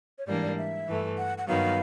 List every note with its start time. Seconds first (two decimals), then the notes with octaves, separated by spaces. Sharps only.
0.19 C#5
0.26 G#2 E3 G3 A#3 D4 D5
0.42 D5
0.57 E5
0.88 G2 E3 A3
1.18 F#5
1.38 F#5
1.48 G2 D#3 F#3 B3 F5